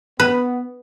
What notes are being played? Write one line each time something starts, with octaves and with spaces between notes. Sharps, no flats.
B3 B4